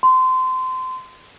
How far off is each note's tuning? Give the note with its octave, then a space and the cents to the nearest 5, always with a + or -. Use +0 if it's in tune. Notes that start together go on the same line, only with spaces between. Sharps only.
C6 -25